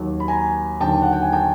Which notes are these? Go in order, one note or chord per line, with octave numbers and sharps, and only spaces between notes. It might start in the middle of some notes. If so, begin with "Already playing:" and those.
Already playing: D#2 D#3 F#3
B5
G#5 A#5
D#2 D3 F#3 G5 A5
F#5
G5
G#5
G5 A5